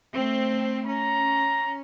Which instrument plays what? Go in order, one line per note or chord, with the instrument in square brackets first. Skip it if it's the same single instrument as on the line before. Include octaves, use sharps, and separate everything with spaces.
[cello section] A3 C4
[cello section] C#4 [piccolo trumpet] A#5